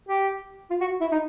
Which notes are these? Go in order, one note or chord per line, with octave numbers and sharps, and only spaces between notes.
G4
F4
F#4
E4
D#4